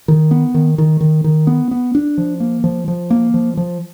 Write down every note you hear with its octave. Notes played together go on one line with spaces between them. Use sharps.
D#3
B3
D#3
D#3
D#3
D#3
B3
B3
D4
F3
A#3
F3
F3
A#3
F3
F3